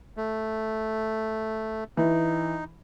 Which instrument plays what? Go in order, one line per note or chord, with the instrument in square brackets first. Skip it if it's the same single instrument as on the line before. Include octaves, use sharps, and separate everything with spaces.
[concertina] A3
[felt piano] E3 [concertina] D#4